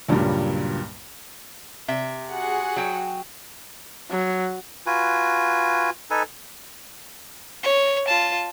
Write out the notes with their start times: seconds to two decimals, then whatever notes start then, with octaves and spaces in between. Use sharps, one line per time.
0.09 C#2 G2 A#2 F#3 G3
1.88 C3 E5
2.31 F#4 G#4 F#5
2.76 F#3 G5
4.11 F#3
4.87 F4 F#4 B4 G#5
6.11 D#4 A4 B4 G#5
7.63 C#5
8.07 F4 A5